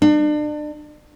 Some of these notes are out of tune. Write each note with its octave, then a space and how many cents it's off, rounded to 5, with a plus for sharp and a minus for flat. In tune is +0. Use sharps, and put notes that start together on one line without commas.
D4 +35